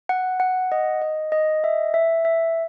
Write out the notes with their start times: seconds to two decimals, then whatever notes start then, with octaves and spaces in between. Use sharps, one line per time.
0.09 F#5
0.40 F#5
0.72 D#5
1.02 D#5
1.32 D#5
1.64 E5
1.94 E5
2.25 E5